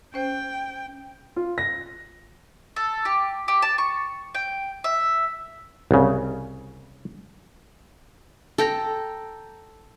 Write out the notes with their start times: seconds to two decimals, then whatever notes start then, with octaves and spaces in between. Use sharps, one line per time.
0.14 C#4 C5 G5
1.36 F4
1.58 A#6
2.76 A4
3.05 G4
3.48 G4
3.62 A5
3.78 C#6
4.34 G5
4.84 E5
5.91 C2 C#3
8.58 A4 G5 A#5